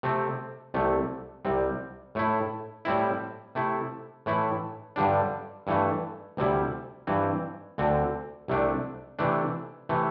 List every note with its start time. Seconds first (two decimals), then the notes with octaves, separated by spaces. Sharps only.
0.03 C3 A3 C4
0.74 C2 C3 A3
1.45 C2 C3 G3 C4
2.15 A2 A3 E4
2.85 A2 G3 C4 E4
3.55 C3 A3 E4
4.26 A2 E3 A3 E4
4.96 G2 D3 G3 D4
5.67 G2 E3 A3
6.37 D2 C3 G3 E4
7.07 G2 E3 C4
7.78 D2 D3 C4
8.48 C2 C3 A3 D4
9.19 C3 E3 A3 D4
9.89 C3 E3 A3